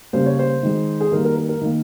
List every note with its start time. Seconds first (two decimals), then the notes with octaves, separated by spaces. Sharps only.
0.13 C#3 G3 A#3 C5
0.26 C#5
0.39 C5
0.63 D#3 G#3
1.00 G#4
1.12 D#3 G3 A#3 A#4
1.25 A#4
1.37 A#4
1.49 A#4
1.61 D#3 A#3